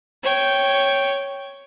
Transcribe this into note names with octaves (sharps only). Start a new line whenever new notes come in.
C#5 G5